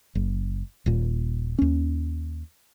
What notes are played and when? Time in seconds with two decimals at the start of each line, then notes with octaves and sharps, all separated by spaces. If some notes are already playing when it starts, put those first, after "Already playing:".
0.15 F#1
0.86 D#1 A#2
1.59 D#2 C#4